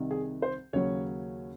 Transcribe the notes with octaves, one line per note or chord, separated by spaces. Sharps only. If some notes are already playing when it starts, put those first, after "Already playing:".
Already playing: C2 C3 D#3
G#4
C5
D#2 C#3 F#3 C#4 C#5